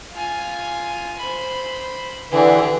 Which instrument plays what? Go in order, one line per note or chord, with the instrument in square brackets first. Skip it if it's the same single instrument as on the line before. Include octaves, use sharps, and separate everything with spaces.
[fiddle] F4 G#5
C5 B5
[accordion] D3 E3 [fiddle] G4 G#4